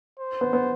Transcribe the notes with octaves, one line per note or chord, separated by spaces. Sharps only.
C5
B3
B3